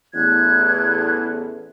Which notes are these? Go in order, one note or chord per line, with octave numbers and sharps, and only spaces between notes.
A1 E2 F#6 G#6